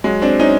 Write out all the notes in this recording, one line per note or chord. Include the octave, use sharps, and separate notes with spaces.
F#3 G#3
C4 D4
C#4 D#4